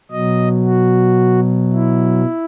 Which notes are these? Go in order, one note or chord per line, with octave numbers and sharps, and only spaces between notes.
B2 F#3 D#5
F#4
E4